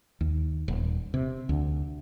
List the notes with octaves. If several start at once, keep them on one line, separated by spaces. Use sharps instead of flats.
D#2
D#1
C3
D2